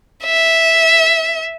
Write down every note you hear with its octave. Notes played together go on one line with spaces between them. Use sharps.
E5